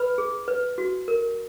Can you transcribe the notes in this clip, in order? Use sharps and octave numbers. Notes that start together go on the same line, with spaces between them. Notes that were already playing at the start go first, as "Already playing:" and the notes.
Already playing: B4 B5
G#4
B4
F#4
A#4